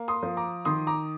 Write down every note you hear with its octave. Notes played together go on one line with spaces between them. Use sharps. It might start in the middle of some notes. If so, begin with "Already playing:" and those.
Already playing: A#3
C6 D#6
F3
A#5 D6
D#3 C6 D#6
A#5 D6